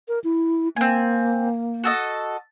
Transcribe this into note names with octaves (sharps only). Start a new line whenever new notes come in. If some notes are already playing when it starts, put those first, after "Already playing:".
A#4
E4
A#3 C4 G#5
F#4 A4 D#5